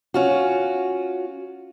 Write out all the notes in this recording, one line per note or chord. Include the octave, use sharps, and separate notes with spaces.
C#4 F4 F#4